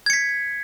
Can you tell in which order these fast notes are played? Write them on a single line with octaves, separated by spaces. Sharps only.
G#6 C#7 B6